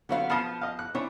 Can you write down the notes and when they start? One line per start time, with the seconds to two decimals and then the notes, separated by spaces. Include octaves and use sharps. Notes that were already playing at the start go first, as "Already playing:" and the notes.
0.09 D3 F#3 B3 C4 F#4 F5
0.30 F3 B3 F5 A5 D#6
0.61 D#5 F5
0.79 F#6
0.95 E3 C4 D4 C#5